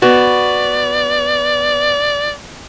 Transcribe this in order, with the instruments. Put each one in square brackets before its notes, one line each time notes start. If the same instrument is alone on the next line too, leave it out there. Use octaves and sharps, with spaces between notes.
[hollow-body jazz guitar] B3 F#4 [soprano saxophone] D5